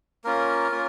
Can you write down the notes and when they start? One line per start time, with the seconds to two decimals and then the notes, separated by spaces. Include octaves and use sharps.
0.24 A#3 C#4 F4 A#4
0.71 A#3 C#4 F4